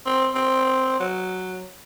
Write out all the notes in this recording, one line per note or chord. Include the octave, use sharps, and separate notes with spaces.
C4
C4
F#3